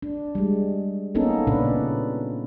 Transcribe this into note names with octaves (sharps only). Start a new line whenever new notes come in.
D4
G3 G#3
A#3 B3 C#4 D#4 A4
A#2 C#3 C#4 D4 B4